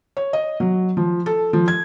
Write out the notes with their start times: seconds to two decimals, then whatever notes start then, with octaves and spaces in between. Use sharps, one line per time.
0.17 C#5
0.33 D#5
0.60 F#3
0.97 F3
1.26 A4
1.53 F3
1.68 G#6